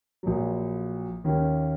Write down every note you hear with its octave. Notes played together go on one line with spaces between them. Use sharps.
A#1 A#2 F#3
D#2 D#3 A#3 C#4